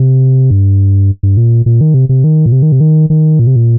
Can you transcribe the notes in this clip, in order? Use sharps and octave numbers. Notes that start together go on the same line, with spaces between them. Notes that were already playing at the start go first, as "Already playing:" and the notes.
Already playing: C3
G2
G2
A#2
A#2
D#3
C3
C3
D#3
A#2
C3
D#3
C3
D#3
D#3
A#2
C3
A#2